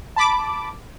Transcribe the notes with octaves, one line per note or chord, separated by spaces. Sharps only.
A5 B5 D6